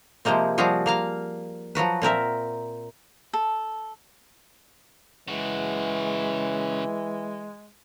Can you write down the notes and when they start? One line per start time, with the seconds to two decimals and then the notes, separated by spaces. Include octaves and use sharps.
0.25 C3 F3 G#3 A#3 C4
0.58 F3 G3 C4 F4 F#4 G#4
0.86 A#3 F5 A#5
1.75 F3 F#3 F#4 B4
2.02 A#2 C4 A#4 E5
3.33 A4
5.28 C#3 E3 G#3 F#4